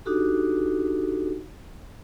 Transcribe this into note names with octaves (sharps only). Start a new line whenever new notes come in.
D4 D#4 F#4 G4 A4